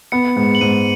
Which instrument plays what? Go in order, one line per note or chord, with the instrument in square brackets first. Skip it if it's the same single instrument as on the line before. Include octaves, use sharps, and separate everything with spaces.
[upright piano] B3 [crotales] C#7
[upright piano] G#2
[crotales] F#7
[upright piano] G#2 [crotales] D#7